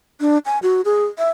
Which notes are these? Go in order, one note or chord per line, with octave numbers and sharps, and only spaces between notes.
D4
G#5
F#4
G#4
E5